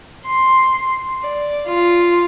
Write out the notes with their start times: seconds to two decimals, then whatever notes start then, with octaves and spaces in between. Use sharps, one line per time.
0.27 C6
1.23 D5
1.68 F4